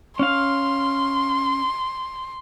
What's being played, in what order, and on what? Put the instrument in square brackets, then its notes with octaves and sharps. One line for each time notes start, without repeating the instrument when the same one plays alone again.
[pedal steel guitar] C#4 F5 [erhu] C6